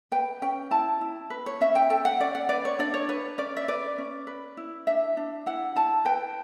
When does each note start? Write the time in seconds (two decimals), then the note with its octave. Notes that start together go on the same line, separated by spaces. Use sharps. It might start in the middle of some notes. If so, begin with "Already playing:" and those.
0.12 B4 G5
0.42 C#4 G5
0.71 E4 A5
1.01 E4
1.30 B4
1.46 C#5
1.61 C#4 E5
1.75 G5
1.90 A4 G5
2.05 F#5
2.20 C#4 D5
2.35 F#5
2.49 B4 D5
2.65 C#5
2.79 D4 D5
2.94 C#5
3.09 B4 C#5
3.38 C#4 D5
3.57 E5
3.68 B4 D5
3.98 C#4
4.27 B4
4.57 E4
4.87 D4 E5
5.17 D4
5.46 E4 F#5
5.76 E4 A5
6.05 B4 G5